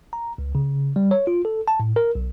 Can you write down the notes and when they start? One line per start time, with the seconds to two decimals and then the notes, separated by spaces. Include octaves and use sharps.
0.13 A#5
0.38 C#2
0.55 C#3
0.96 G3
1.11 C#5
1.27 F4
1.45 A4
1.68 A5
1.80 A2
1.96 A#4
2.15 B1